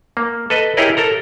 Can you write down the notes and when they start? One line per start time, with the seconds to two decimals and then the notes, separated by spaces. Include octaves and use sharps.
0.17 A#3
0.50 A4 B4 D#5
0.77 E4 G4 G#4 A#4 C#5 D#5
0.97 A4 A#4 A#5